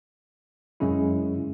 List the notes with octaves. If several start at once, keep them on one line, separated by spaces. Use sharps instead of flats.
F#2 C#3 G#3 C#4 E4